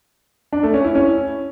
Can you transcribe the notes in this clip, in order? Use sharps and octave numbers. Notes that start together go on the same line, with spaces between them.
D4
A3
C#4
E4
C#4